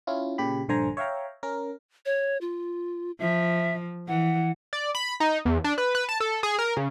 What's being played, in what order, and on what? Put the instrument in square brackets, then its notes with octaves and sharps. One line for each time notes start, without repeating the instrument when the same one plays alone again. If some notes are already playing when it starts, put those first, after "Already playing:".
[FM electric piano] C#4 E4 F4
A#2 C#3 G4 B5
A#1 G2 D3 C5 G#5 A#5
C#5 E5 F5 G5 A#5
C#4 A#4
[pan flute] C#5
F4
[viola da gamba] F3 [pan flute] E5
[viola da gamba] E3 [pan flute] F#5
[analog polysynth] D5
B5
D#4
E2
D4
B4
B4
A5
A4
G#4
A#4
C#3